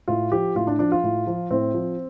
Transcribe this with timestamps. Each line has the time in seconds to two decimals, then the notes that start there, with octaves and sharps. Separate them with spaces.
0.08 A2 F4
0.32 F3 G4
0.55 A2 F4
0.67 D4
0.79 F3 D4
0.92 F4
1.03 A2
1.27 F3
1.50 A2 C4
1.74 F3